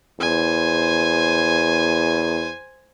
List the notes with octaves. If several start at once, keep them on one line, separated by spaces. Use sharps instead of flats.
E2 C5 G#5